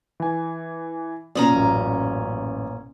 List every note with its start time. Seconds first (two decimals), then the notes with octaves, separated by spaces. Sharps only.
0.20 E3 G#5
1.35 A#2 C#4 D5 A#5 D#6
1.51 A1 F#2